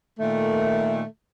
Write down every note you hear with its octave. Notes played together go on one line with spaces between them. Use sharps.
A#2 D#3 A3